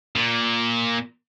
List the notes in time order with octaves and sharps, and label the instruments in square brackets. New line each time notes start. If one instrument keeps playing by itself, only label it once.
[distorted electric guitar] A#2